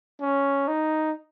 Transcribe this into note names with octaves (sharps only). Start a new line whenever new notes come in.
C#4
D#4